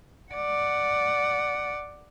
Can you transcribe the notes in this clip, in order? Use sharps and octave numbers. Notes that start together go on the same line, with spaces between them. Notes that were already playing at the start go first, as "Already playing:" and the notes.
D5 F#5